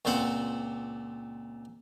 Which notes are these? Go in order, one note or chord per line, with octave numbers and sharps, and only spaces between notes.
C#2 A#2 C4 C5 F#5